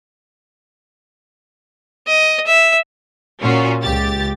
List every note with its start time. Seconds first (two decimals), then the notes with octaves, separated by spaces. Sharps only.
2.08 D#5
2.47 E5
3.41 A#2 C#4 F4 F#4
3.81 C#2 G4 A6